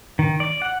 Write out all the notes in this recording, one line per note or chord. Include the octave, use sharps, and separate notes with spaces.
D#3
D5
F#5